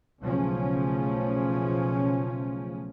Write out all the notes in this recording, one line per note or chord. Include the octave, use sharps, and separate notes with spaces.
B1 C#3 F3 A3 C#4